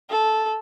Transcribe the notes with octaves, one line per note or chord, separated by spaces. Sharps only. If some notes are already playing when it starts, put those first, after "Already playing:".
A4